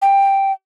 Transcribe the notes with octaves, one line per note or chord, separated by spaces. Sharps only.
G5